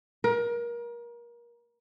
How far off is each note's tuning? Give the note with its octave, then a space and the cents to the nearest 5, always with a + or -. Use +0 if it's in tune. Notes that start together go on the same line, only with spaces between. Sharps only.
A#4 +30